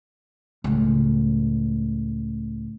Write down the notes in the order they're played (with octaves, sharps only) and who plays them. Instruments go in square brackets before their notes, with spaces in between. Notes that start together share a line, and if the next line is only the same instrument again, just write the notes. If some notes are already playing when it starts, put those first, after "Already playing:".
[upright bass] C#2 A2